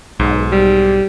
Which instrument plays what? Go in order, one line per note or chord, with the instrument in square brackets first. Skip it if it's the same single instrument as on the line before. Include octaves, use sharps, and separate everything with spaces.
[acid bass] B1 [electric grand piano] G#2
[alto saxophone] G3